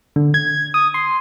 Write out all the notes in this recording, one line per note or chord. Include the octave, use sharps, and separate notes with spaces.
D3
G#6
D#6
C6